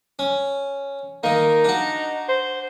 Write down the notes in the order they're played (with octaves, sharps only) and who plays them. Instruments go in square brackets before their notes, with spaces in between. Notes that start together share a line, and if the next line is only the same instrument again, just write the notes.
[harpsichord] C#4
[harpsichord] D#3 A#3 [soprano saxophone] D#4
[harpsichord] D4 F#4
[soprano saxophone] C5